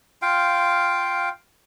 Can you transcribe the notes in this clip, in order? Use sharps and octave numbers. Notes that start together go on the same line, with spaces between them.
F4 F5 G5